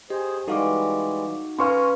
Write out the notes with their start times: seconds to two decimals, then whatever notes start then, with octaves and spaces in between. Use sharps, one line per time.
0.10 G4 G#4 C5 D#5
0.48 E3 G3 G#3 D#4 F#4 A4 F5 D6
1.59 C#4 B4 F5 G#5 A#5 C6 C#6 F6